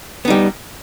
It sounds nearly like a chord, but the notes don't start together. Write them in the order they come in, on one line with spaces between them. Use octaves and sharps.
B3 D#4 G3